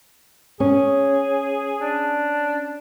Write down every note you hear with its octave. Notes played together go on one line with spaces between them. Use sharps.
C#4 G#4
D4